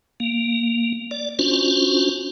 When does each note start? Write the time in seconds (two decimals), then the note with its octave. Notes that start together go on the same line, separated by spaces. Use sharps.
0.20 A#3
1.11 D5
1.39 C#4 D4 F4 F#4 C5